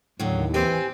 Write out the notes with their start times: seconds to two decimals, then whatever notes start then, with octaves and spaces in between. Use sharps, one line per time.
0.19 D#2 A2 D3 F#3
0.54 E3 C4 G4 B4 G#5